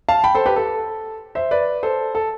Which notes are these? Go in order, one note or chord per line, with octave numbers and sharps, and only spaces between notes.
F5 A5
G5 B5
A4 C5
G4 B4
A4
C5 E5
B4 D5
A4 C5
A4